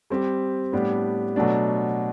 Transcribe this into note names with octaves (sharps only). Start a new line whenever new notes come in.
G3 C4 G4
A2 G3 B3 D4 G4
B2 F#3 A3 D4